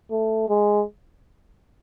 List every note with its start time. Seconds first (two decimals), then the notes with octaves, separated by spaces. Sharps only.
0.11 A3
0.49 G#3